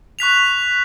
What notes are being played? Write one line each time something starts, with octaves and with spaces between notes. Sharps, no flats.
C#6 F#6 B6 F7